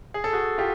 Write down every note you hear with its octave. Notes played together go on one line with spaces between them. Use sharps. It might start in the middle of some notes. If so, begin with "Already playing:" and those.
G#4
A4
F#4 G#4
F4 G4